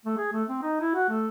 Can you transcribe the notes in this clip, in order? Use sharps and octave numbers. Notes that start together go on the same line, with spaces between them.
A3
G#4
A3
C4
D#4
E4
F#4
A3